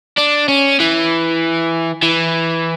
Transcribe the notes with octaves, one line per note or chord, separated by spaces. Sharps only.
D4
C#4
E3
E3